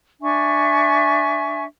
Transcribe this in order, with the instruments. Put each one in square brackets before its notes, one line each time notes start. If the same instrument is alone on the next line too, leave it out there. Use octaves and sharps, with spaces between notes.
[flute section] D4 E5 G#5 C#6